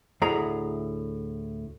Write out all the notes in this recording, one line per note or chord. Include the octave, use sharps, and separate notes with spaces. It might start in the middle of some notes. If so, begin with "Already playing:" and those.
D2 A2 G#4 A#5